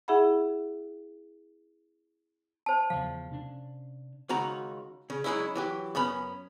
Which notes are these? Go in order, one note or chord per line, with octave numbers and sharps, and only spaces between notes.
E4 G#4 E5 F#5 B5
C5 A5
E2 C#3 F3 F5
C3 C#4 D4
C#2 D#3 F#4 A#5
C#3
F#3 G#3 C#4 D#4 E4
E3 F#3 G4
F#2 B3 C#4 B5